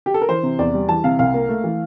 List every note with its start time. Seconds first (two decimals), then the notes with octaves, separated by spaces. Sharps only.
0.06 G4
0.14 A4
0.22 A#4
0.29 E3 C5
0.43 C3
0.59 E2 D5
0.74 G3
0.89 E3 A5
1.04 C3 F5
1.19 C2 F5
1.34 A#3
1.49 A3
1.64 E3